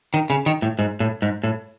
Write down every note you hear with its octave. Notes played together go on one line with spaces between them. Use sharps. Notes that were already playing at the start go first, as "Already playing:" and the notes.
D#3
C#3
D#3
A2
G#2
A2
G#2
A2